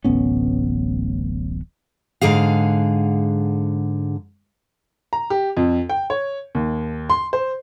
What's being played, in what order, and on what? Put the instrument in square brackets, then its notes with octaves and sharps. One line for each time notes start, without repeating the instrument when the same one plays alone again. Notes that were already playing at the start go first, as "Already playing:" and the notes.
[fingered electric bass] D1 A1 B3 C#4
[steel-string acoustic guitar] G#2 D3 G#4 F5
[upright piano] A#5
G4
F2
G5
C#5
D#2
C6
C5